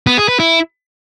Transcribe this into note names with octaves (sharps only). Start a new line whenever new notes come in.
B3
G#4
B4
E4